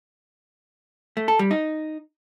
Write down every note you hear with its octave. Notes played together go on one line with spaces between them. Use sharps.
A3
A4
G3
D#4